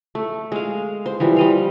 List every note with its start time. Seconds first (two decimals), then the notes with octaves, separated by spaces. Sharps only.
0.15 A3
0.52 G#3 F5
1.06 C5
1.20 E3 F3 G3
1.36 G3 D#5 F5